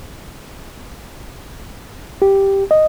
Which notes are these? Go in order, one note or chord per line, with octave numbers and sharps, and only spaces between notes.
G4
D#5